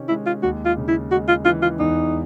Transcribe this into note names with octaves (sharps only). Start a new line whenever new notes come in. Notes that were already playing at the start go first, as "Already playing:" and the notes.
Already playing: C3 D#3 C#4
G#3 E4
F4
D#2 F#4
F4
C#3
E4
G#3 F#4
F4
E3 F4
F4
E2 D#4